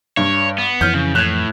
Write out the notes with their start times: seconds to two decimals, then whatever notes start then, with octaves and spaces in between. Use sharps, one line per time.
0.17 G2 C#5
0.58 B3
0.81 F2 E3 F6 G6
0.94 C#3
1.15 A2 F#6 G#6